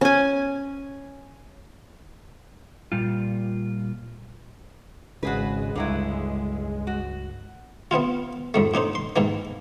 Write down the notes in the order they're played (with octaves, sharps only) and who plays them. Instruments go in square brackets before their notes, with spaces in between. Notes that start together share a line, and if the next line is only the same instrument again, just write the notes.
[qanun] C#4 G#5
[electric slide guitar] A#2 G3 F4
[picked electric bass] G#1 C#3 [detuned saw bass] G#3 [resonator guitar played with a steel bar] F#4 G#4 B4
[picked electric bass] C#2 G2 [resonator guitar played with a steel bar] D3 F#3 E4
[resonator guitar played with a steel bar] F#4
[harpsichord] B3 C4 E4 F4
F2 G#2 A3
A2 D4 D#4 C5
C6
G#2 D#3 E3 A#3